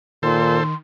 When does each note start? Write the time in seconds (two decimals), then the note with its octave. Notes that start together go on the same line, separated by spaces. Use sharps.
0.23 A#2 D#3 A4 C5 C6